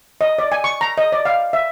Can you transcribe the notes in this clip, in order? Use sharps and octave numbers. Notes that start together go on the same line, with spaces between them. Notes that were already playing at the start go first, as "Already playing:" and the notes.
D#5
D5
G#5
C#6
A#5
D#5
D5
F5
E5